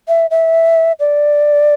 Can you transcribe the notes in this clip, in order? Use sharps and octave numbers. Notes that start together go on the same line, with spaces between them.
E5
E5
D5